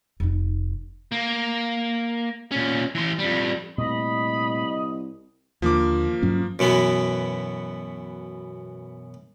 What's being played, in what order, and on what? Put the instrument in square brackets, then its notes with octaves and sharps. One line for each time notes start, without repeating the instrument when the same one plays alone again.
[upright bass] F1 D#4
[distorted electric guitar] A#3
A#2 C#4
E3 C6
F2 G3
[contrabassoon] C2 [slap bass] A#2 A3 [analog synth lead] D#5 [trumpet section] B5
[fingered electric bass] D#2 D3 [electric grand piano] F3 A#3 D6
[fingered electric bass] G2 F#3 C#4
[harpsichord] F#2 B2 E3 B3